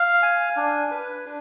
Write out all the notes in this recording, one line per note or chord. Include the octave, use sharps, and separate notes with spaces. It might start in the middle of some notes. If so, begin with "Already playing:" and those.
Already playing: F5
G#5
D4
B4
D4